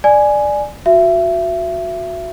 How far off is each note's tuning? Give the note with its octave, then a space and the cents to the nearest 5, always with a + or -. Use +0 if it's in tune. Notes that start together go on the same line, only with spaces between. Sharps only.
D5 +10 G#5 +5
F#4 -10 E5 +30